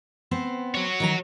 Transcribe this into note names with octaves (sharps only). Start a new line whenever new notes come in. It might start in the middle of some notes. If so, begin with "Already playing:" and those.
B3 C4 C5
F#4 C#5
D#3 F#3 A#5